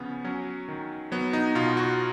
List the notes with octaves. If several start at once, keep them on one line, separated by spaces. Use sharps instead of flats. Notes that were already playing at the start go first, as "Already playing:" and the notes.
Already playing: C#3 F3 B3 C#4
F#3 C#4
D#3
F#3 B3
D#4
B2 F4
F#4